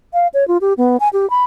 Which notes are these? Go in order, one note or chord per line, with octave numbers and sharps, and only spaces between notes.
F5
C#5
F4
G4
B3
G#5
G4
B5